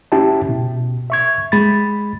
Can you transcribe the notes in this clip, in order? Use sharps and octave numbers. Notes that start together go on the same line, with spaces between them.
C#4 E4 G4 E5 G5 A5
B2
E5 C#6 G#6
G#3 B5 A6